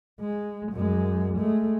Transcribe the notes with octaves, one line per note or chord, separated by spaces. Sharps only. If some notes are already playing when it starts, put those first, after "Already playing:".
G#3
F#2 G#3
G#3 A3